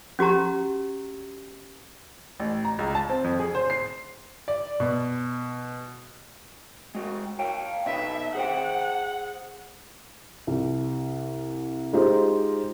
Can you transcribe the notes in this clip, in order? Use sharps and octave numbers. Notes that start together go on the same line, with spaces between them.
C#4 F#4 G4 A#5
A1
A#5
C#2
A5
C4
F2
G#4
C5
C7
D5
B2
G#3 F#4
C#5 F5 G5
B2 D#4 B4 E5
G#4 C5 F#5 G5
C2
G#3 D#4 F4 G4 G#4 C5